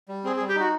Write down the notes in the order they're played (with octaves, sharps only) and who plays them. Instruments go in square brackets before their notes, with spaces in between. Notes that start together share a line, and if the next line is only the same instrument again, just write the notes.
[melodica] G3
[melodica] C4 [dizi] G#4
[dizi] G#4
[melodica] G3
[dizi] G4
[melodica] D#4 [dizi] F#4